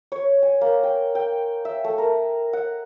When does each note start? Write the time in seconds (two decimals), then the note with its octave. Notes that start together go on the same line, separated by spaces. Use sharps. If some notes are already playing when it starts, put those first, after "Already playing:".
0.12 C#5
0.43 G#5
0.61 A#3
0.83 G5
1.15 G5
1.65 E5
1.84 A3
1.98 A#4
2.53 F#5